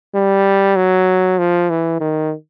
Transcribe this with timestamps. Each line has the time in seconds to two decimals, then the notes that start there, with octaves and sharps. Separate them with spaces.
0.15 G3
0.76 F#3
1.38 F3
1.70 E3
2.00 D#3